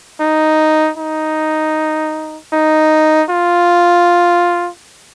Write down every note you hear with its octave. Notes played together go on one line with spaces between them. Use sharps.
D#4
D#4
D#4
F4